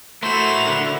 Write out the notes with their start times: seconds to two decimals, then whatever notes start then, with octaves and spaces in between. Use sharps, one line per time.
0.23 A3 E4 F#4 A#4 C5 E5 E7 F7
0.68 D3